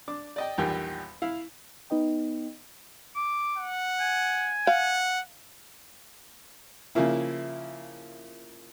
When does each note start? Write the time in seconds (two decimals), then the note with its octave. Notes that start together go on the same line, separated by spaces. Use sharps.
0.08 D4 D6
0.36 D5 D#5 G5
0.58 A#1 E2 D#3 G3 G5 G#5
1.22 E4 F5
1.90 B3 D#4 B4 D#5 G5
3.16 D6
3.58 F#5
4.00 G#5
4.67 F5 F#5
6.95 C#3 F3 A#3 E4